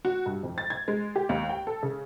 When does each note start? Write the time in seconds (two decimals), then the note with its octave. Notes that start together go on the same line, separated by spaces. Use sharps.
0.05 F#4
0.26 G2
0.43 F2
0.58 A6
0.70 G#6
0.88 G#3
1.16 G4
1.29 D#2
1.49 G5
1.67 A4
1.83 C#3